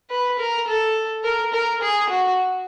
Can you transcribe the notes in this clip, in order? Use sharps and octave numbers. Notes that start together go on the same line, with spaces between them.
B4
A#4
A4
A#4
A#4
G#4
F#4